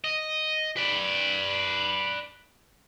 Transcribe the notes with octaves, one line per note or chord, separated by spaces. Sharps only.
D#5
B4 D5